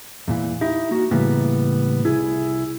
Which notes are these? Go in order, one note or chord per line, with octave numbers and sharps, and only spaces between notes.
E2 A#2 E3
D#4 E4 G4
A#3 F#4
A2 C#3 E3 G3 A#3 B3
C2 E4 G#4